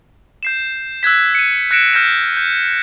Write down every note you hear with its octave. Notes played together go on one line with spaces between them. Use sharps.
G6 C7 E7
E6 F#6 G#6 B6
C#7 D#7
F#6 G#6 A#6 C#7 D7 E7
F6 G6 A#6 E7
G6